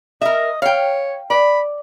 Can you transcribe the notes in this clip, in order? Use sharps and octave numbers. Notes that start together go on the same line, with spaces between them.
A#4 D#5 E5
C#5 F5 G5
D5 B5